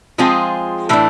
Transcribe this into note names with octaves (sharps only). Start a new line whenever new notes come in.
F3 G#3 C4 F4 G#4
A2 E3 A3 D4